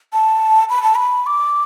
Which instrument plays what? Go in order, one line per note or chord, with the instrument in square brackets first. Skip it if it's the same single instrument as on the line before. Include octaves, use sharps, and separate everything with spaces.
[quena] A5
B5
A5
B5
D6